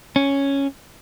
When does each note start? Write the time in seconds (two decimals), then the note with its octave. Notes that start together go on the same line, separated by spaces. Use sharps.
0.16 C#4